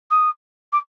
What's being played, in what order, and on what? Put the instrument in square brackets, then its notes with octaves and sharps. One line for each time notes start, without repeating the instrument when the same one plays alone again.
[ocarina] D#6
D6